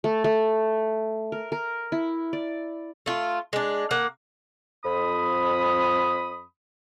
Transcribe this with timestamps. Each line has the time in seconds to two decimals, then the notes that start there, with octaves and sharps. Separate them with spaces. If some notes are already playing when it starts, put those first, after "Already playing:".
0.04 A3
0.24 A3
1.32 A#4
1.52 A#4
1.92 E4
2.33 D5
3.06 A3 F4
3.53 G#3 D4
3.91 A#3 F#5
4.85 F2 B5 D#6